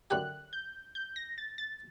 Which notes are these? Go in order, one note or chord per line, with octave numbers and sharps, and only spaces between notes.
F#2 D3 A3 D#4 G4 F#6
G6
G6
A#6
A6
A6